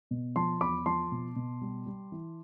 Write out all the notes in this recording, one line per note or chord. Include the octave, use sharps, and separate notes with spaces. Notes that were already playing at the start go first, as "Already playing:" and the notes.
B2
F3 A5 C6
E2 B5 D6
F3 A5 C6
B2
B2
G3
G3
E3